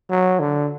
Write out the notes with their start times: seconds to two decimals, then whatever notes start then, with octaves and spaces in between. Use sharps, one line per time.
0.10 F#3
0.40 D3